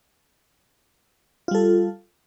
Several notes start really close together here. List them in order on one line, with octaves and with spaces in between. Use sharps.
F4 G3 A4